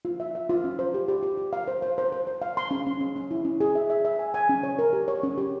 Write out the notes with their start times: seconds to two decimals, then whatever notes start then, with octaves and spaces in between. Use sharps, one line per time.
0.05 F4
0.20 E5
0.35 E5
0.50 F4
0.64 C#4
0.79 C5
0.94 G4
1.08 G4
1.23 G4
1.38 G4
1.53 F5
1.68 C5
1.82 C5
1.98 C5
2.12 C5
2.27 C5
2.42 F5
2.57 C6
2.71 C#4
2.87 C#4
3.01 C#4
3.16 C#4
3.31 E4
3.45 C#4
3.60 G#4
3.75 E5
3.90 E5
4.05 E5
4.19 G#5
4.34 G#5
4.49 C#4
4.63 C#5
4.79 A#4
4.93 G4
5.08 C#5
5.23 C#4
5.38 G4